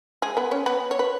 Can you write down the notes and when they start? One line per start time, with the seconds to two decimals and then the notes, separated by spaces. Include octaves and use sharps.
0.22 G#3 G#4
0.37 B3 B4
0.51 C#4 C#5
0.66 B3 B4
0.91 C#5
0.99 B4